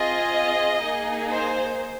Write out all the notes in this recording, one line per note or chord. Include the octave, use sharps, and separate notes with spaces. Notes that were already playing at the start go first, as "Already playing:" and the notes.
Already playing: C4 F4 G#4 D#5
A#3 D#4 G#4
C5